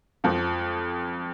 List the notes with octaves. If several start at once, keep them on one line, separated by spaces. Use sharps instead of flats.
F2 F3